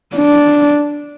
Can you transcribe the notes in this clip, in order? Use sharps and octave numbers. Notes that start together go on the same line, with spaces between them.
D4